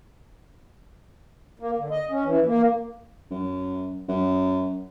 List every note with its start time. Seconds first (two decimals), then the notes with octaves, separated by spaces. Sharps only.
1.60 A#3
1.78 D3
1.91 D#5
2.11 C#4
2.25 E3
2.46 A#3
3.31 F#2
4.08 F#2